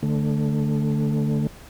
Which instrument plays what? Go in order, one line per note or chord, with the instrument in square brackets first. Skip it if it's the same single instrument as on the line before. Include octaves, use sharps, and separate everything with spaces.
[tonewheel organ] D3 A3